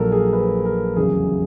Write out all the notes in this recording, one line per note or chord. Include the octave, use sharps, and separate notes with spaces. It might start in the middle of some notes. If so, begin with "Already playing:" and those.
Already playing: A#1 A#2 F#3 A4 A#4
G#4
B4
A#4
F1 E2 C#3 F#3 G#4